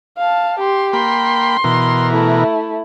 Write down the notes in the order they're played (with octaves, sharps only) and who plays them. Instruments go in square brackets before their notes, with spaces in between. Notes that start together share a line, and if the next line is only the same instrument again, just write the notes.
[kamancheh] F5 A5
G4 C6
[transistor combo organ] A#3 G5 B5 [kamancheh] C6
[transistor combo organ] B2 E3 A#4
[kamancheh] A3 E4